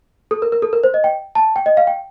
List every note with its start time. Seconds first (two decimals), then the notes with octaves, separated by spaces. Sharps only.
0.31 A4
0.42 A#4
0.52 A#4
0.62 A4
0.73 A#4
0.83 C5
0.94 D#5
1.04 G5
1.35 A5
1.56 G5
1.66 D#5
1.77 F5
1.87 G5